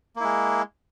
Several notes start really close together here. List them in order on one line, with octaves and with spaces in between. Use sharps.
A#3 E4 G#3